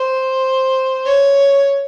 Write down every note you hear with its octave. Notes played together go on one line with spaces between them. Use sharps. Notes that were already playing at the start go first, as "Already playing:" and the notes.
Already playing: C5
C#5